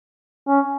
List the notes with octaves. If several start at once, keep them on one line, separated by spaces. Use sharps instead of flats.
C#4